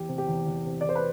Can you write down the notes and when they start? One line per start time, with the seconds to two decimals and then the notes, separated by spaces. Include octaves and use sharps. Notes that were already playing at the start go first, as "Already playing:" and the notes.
Already playing: E2 G4
0.09 C3
0.18 G4
0.27 E2
0.46 E2
0.66 C3
0.81 D5
0.84 E2 C5
0.96 B4